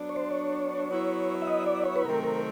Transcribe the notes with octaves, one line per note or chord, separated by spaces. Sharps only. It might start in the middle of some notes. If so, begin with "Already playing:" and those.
Already playing: F#3 B3 D4
C#5
C5
C#5
F#3 B3 E4
E5
D#5
D5
C#5
B4
C3 D#3 F#3 A3 C4 A#4
A#4